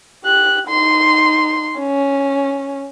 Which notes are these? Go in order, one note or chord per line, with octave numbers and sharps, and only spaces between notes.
G4 F#6
D#4 C6
C#4